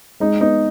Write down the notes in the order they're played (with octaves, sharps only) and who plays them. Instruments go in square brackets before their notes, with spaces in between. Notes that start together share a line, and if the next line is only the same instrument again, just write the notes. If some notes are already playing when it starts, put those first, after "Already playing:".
[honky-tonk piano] G#3 [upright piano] D#4
[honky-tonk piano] B3 [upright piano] D#4